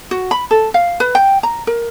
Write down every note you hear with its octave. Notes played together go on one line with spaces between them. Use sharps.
F#4
B5
A4
F5
B4
G5
A#5
A#4